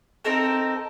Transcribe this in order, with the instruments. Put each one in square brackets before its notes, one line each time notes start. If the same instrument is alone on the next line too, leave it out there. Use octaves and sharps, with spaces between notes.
[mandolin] C4 D#4 A4 A#4